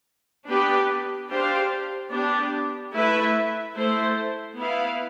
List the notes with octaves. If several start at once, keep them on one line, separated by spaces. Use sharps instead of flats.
B3 D4 G4 B4
D4 G4 C5 F5
B3 D4 G4
A3 E4 B4 E5
A3 E4 A4 C5
B3 E4 B4 F5